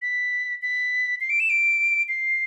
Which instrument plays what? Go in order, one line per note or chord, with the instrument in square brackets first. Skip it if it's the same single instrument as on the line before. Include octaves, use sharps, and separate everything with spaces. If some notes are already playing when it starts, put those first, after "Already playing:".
[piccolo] B6
B6
C7
D7
E7
D7
C7